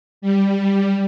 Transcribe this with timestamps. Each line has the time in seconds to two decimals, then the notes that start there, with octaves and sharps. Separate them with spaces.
0.22 G3